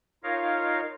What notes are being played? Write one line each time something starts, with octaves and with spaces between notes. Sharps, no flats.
D#4 F4 A#4 C#5 D#5 F5